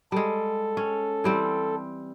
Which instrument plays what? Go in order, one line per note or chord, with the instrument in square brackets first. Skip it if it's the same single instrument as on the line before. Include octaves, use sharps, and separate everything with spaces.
[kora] G3 G#3 [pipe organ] A4
[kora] C#4
E3 G3 C4